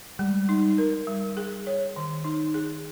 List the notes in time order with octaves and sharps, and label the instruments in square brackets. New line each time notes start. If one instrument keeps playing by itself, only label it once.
[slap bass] G3 [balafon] G#3
[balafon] D#4
A#4
G3
G#4
C#5
D#3
D#4
G#4